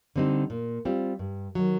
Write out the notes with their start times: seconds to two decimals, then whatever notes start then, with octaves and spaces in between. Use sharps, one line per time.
0.16 D3 G3 C4 D#4
0.50 A#2
0.85 G3 C4 F4
1.19 G2
1.55 D#3 F#3